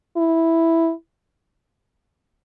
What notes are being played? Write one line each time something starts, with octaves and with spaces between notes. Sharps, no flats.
E4